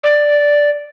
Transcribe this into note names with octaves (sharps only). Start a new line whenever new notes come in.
D5